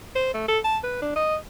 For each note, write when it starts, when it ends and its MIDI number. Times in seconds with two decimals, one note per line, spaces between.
0.15 0.34 72
0.34 0.46 57
0.48 0.59 69
0.65 0.78 81
0.84 0.98 71
1.02 1.11 62
1.16 1.36 75